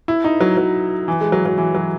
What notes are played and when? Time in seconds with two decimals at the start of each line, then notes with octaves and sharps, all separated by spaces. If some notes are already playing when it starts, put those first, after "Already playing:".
0.08 E4
0.24 D#4
0.41 F#3
0.57 F#3
1.08 E3
1.21 G#3
1.32 F#3
1.46 F#3
1.58 E3
1.75 F#3